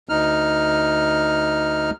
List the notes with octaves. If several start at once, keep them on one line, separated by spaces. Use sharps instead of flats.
D2 D#4 F6